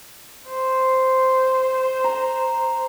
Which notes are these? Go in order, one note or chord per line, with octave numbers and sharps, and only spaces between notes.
C5
A#5